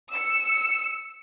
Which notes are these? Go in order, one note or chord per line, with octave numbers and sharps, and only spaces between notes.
E6 C#7